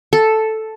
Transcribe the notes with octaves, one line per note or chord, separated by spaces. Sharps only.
A4